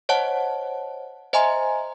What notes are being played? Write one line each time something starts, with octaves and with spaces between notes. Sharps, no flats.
C5 C#5 D#5 F#5 A5
C5 D#5 E5 G#5 A#5 C6